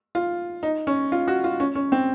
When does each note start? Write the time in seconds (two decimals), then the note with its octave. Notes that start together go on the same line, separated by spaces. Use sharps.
0.15 F4
0.63 D#4
0.87 C#4
1.12 F4
1.28 F#4
1.44 F4
1.60 C#4
1.75 C#4
1.92 C4